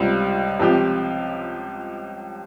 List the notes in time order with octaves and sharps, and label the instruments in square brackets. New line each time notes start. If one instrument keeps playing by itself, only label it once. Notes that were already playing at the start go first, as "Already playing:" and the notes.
Already playing: [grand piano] C#2 C3 G3 C4 F4
C#2 C3 F3 C4 G4